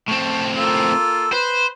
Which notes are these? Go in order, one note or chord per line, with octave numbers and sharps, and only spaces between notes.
A2 C4 A5 C#6
A#3 F4 A4
B4 C5